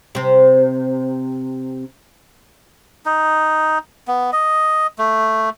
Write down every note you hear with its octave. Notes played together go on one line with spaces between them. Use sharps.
C3 C4
D#4
B3
D#5
A3